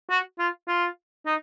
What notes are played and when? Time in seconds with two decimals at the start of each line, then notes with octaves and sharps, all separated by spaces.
0.10 F#4
0.39 F4
0.68 F4
1.26 D#4